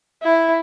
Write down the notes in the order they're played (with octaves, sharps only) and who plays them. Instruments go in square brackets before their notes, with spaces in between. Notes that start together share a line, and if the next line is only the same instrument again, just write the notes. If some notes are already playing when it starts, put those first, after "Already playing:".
[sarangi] E4